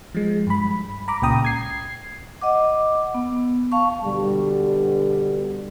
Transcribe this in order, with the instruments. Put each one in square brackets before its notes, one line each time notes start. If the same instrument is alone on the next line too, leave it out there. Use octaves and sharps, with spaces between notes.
[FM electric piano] F3 G#3
G2 B5
A#5 B5 D6
C#2 A#2 C#3 G5 A#5 D#6
G#6 C7
[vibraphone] D#5 F#5 D6
B3
F5 A5 C#6
[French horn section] B2 D3 G3